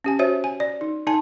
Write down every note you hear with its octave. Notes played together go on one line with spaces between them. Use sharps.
C#4 G4 G#5
F#4 C5 C#5 E5
G#5
D5
D#4
D#4 G#5 A5